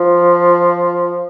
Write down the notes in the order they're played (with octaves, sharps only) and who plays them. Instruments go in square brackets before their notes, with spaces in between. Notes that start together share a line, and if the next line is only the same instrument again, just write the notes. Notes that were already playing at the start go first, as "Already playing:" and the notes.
Already playing: [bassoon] F3